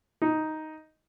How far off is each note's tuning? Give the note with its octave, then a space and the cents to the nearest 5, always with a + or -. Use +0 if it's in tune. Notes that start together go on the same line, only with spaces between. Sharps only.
D#4 +5